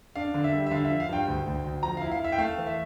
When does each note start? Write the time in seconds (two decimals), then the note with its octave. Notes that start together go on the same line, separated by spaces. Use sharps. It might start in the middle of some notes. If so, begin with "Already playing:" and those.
0.15 D4 F5
0.34 D3
0.44 E5
0.53 G3
0.66 E5
0.71 D3 F5
0.85 E5
0.90 F3
1.00 F5
1.09 G2 G5
1.27 D2
1.46 D2
1.64 D2
1.83 F3 A#5
1.97 E4 F5
2.12 F5
2.20 E4 E5
2.32 G5
2.38 A3 F5
2.58 E3
2.67 E5